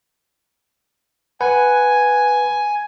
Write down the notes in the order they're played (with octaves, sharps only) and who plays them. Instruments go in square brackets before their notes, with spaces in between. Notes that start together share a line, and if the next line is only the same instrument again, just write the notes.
[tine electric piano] B4 F#5 [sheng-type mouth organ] G#5